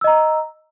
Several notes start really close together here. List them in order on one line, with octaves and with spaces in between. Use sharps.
E6 D#5 A#5